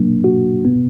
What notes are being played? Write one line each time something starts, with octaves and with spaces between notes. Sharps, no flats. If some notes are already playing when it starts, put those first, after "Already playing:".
Already playing: F#3 A#3 D4
F#4
B3